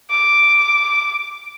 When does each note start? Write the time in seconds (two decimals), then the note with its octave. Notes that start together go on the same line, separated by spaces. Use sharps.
0.10 D6